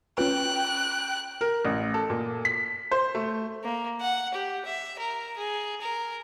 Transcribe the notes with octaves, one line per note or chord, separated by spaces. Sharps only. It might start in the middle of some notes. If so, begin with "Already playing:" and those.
C#4 F4 B4 G5 F#6
A#4
A1
A4
A#2
B6
C5
A3
A#3
F#5
G4
E5
A#4
G#4
A#4